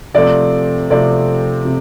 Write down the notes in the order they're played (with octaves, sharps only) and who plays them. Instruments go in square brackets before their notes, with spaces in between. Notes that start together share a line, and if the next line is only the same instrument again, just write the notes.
[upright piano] C3 F3 A3 C4 D5
C3 F3 A3 C4 D5
C3